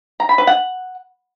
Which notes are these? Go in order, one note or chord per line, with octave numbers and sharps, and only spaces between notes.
A#5
B5
B4
F#5